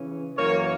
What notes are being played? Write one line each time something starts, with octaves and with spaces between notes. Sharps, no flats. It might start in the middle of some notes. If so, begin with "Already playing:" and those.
Already playing: C#3 E3 C#4
F#2 E3 A#3 A#4 C#5